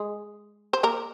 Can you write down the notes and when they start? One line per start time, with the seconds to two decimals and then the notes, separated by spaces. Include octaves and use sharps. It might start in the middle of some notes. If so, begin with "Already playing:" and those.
Already playing: G#3 G#4
0.73 C5
0.83 A#3 A#4